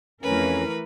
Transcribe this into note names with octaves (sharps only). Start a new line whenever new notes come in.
F2 E3 A3 C#4 A#4 B4